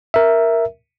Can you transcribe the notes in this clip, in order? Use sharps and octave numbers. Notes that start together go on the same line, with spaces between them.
A#4 E5